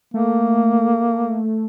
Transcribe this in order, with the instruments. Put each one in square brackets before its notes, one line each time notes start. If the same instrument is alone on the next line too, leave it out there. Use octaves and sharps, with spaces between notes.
[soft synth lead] A3 [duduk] A#3